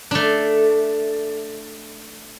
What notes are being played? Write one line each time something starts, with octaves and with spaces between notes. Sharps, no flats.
A3 D4